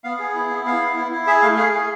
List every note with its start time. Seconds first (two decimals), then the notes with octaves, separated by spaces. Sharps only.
0.04 B3 F5
0.19 G#4
0.35 E4
0.50 B3
0.65 B3 F5
0.81 E4
0.96 E4
1.12 E4
1.27 G#4 E5
1.42 A3 F5
1.57 G#4 F5
1.72 G#4